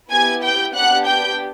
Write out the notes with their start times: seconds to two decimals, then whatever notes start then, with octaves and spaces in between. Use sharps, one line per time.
0.11 B3 E4 G4 G#5 G#6
0.42 G5 G6
0.74 B3 D4 G4 F#5 F#6
1.05 G5 G6